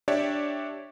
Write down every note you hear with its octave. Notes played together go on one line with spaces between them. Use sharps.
D4 G4 C#5 D5 E5